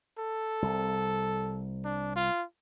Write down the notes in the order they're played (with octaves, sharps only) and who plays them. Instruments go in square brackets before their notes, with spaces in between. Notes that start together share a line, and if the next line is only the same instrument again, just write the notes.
[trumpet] A4
[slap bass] C2
[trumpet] D4
F4